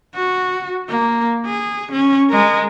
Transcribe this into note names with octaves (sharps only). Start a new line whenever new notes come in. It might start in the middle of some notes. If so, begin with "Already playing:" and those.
F#4
A#3
G#4
C#4
G#3 A#4